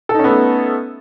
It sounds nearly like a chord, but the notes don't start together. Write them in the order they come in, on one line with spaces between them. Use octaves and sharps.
A4 D#4 C#4 B3 A3